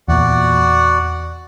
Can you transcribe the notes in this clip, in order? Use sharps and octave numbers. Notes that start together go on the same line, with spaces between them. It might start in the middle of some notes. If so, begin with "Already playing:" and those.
E2 A#2 F#4 D5 F#5